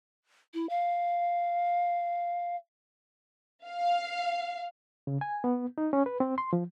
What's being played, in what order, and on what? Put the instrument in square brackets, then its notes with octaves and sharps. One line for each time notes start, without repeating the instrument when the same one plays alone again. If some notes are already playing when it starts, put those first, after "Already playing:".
[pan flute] E4
F5
[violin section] F5
[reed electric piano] C#3
G#5
B3
D#4
C#4
B4
C4
C6
F3